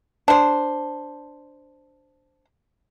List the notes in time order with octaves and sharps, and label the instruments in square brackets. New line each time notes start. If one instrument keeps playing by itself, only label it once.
[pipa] D4 C5